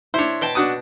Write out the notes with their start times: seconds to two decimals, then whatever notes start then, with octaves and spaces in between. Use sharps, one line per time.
0.14 D4 E4 C5 C#5
0.41 B2 G5 A5
0.55 D4 F#4 D#6